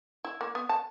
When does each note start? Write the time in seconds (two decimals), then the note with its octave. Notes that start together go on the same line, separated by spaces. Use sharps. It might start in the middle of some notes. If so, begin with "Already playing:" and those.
0.24 E4
0.41 A#3
0.55 B3
0.69 A5